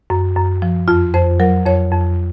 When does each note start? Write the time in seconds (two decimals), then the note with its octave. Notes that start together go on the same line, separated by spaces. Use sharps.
0.10 F#2
0.37 F#2
0.62 F3
0.88 F2 F4
1.14 F2 C5
1.40 F#3 A#4
1.66 F2 C#5
1.92 F2